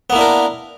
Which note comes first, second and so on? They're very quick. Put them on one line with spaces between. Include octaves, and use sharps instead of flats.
B3 A#3 E4 D4 A#4